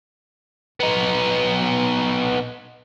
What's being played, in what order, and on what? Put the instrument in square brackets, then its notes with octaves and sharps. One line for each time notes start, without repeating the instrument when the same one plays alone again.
[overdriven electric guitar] B3 D#4